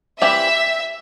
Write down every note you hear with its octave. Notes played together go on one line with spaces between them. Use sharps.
E3 G3 C4 E4 G4 E5